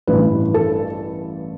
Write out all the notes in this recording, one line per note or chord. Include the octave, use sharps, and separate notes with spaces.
A1 G2 E3 B4
A4